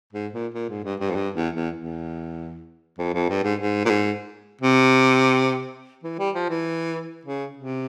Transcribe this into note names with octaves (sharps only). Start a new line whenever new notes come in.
G#2
A#2
A#2
G#2
G2
G2
F2
G2
E2
E2
E2
F2
F2
G2
G#2
G#2
A#2
G#2
C3
E3
G3
F3
E3
C#3
C3